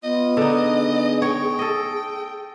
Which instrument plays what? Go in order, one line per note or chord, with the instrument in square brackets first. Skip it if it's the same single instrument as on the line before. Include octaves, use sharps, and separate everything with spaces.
[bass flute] B3 [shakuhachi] F4 [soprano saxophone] D#5
[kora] D3 D#4 [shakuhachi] G#4
[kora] C#5 [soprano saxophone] G5
[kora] A4 D#5